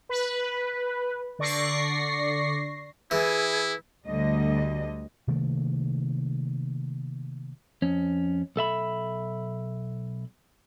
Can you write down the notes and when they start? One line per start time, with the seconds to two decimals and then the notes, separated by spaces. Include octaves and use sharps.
0.09 B4
1.39 D3 D5 C#6 A#6 C7
3.11 E3 E4 G#4
4.06 D2 D3 G3 D#5
5.28 C3 D#3 A3 A#3
7.82 F2 C#4
8.56 B1 A4 E5 B5